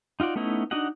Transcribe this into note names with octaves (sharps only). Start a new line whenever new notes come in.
D#4 F4 F#4 D5
A3 B3 C#4 D#4 E4
D4 D#4 F#4 D#5 F#5